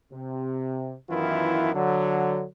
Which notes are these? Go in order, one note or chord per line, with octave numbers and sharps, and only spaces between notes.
C3
F#2 D#3 E3 B3 E4 F4
D3 F#3